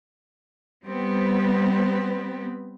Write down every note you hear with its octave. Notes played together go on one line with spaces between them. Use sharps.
G3 B3 C4 B4